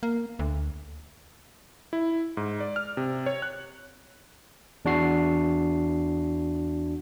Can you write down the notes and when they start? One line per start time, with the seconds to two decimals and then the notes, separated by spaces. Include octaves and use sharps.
0.03 A#3
0.39 D2
1.93 E4
2.37 G#2
2.60 D5
2.76 F6
2.97 C3
3.26 C#5
3.42 F#6
4.85 E2 D4 F#4 C7